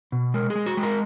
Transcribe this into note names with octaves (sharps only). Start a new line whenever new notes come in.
B2
G#3 A#4
G#4
G#3
F#4
G#3
A#4